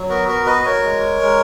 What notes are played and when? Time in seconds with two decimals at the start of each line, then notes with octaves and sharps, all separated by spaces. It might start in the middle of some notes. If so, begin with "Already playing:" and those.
Already playing: F#3
0.09 B3 F#4 A#4
0.28 F#4 A#4
0.46 F#4 B4 D#5
0.65 A#4 C#5
0.84 G#3
1.21 G#3